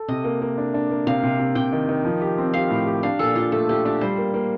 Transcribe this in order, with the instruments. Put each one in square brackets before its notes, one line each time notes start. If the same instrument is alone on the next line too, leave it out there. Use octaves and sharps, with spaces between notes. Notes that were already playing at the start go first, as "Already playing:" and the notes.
Already playing: [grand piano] A4
[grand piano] C3 [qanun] D#5
[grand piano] A#3
A#3
D4
D4
A#3
[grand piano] C3 [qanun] F5
[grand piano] C3
C3
[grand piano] C3 [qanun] G5
[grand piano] D#3
D#3
F3
G4
C4
[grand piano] G4 [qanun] F5
[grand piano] A2
G4
[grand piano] D4 [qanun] F5
[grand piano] A#2 [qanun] A4
[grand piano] D4 [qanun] F4
[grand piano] A3 [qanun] A4
[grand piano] A3 [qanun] G4
[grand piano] D4 [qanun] G4
[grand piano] G3 [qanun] C5
[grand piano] A#3
A#3